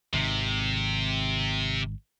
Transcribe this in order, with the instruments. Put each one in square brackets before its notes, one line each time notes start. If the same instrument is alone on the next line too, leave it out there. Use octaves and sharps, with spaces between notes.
[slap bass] G#1 D#3 [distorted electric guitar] C3